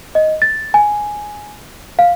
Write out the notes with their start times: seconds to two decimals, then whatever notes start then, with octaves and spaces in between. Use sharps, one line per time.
0.15 D#5
0.42 A6
0.74 G#5
1.99 F5